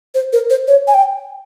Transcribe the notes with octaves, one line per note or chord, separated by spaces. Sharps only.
C5
A#4
C5
C#5
G#5
G5